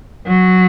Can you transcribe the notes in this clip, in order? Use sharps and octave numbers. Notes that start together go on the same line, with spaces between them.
F#3